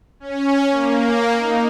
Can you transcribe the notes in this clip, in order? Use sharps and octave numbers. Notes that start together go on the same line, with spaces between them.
C#4
A#3
D#4